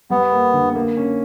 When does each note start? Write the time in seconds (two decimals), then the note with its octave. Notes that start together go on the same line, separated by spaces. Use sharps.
0.10 G3 B3
0.32 A#3
0.54 D3
0.75 A#3
0.97 C#4